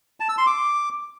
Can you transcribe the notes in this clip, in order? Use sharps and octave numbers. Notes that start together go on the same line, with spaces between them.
A5
E6
C6
D6